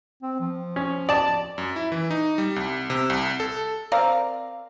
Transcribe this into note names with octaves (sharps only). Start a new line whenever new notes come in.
C4
F3
C#4
D5 A5
F#2
E4
E3
D#4
G3
C2
C3
C2
A4
C4 A#4 D5 F5